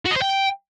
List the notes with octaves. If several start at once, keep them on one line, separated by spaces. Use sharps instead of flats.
F#4
D#5
C5
G5